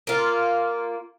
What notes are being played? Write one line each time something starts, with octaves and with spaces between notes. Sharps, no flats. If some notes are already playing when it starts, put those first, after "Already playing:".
A#3 F4